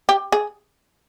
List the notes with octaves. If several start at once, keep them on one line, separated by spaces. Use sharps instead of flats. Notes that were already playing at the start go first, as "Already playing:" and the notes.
G4
G#4